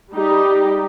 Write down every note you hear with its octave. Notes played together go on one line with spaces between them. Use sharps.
G3 D#4 G4